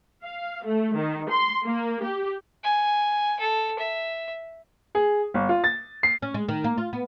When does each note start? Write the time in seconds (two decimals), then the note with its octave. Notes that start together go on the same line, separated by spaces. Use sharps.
0.22 F5
0.64 A3
0.96 D#3
1.30 C6
1.64 A#3
2.03 G4
2.64 G#5
3.40 A4
3.79 E5
4.95 G#4
5.34 G1
5.49 F4
5.64 A6
6.03 C7
6.22 C#4
6.34 G#3
6.49 D#3
6.64 A#3
6.78 F4
6.93 B3